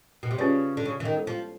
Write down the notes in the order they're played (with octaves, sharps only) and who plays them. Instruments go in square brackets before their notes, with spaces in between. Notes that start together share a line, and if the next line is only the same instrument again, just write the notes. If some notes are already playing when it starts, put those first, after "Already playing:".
[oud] B2
C3
[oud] C#3 [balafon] C#4 F4 G#4 B4 D5
[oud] D3
C#3
E3
D#3
[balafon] G#3 B3 E4 A4 C5
[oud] F3